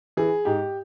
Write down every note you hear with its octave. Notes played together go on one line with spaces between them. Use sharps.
E3 G#4
G#2 G4